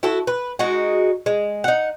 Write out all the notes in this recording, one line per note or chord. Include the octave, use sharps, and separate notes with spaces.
E4 F#4 A4
B4
G#3 D#4 F#4
G#3
D#4 F#5